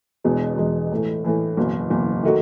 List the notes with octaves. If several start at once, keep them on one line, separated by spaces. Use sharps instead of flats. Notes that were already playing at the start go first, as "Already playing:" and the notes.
E1 E2 B2 G#3
E1 E2 B2 G#3
A2 E3 A3
A2 E3 A3
F#1 E2 B2
F#1 E2 B2
D#3 A3 D#4 F#4